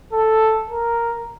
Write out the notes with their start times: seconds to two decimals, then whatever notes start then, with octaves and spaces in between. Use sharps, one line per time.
0.13 A4
0.70 A#4